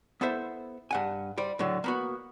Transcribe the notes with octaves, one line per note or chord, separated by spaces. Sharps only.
B3 E4 A4 C5 E5
G2 F#5 G#5
G3 C5 D5
A2 D3 F#3
A#3 B3 F#4